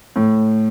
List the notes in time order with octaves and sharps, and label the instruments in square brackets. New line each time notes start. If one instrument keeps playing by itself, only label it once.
[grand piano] A2